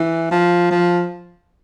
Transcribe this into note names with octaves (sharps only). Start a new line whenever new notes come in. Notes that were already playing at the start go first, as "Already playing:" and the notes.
Already playing: E3
F3
F3